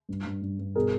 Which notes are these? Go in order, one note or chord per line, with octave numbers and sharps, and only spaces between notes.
G2
G2
G2
G2
B2 G#4 A#4